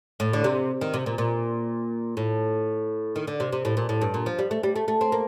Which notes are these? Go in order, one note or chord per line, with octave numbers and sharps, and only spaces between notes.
A2
D3
C3
D#3
C3
A#2
A#2
A2
D#3
D3
C3
C3
A2
A#2
A2
G2
A#2
F3
G3
A3
G3
A3
A3
C4
A#3